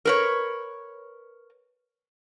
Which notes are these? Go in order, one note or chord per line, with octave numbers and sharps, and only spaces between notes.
A#4 B4 C#5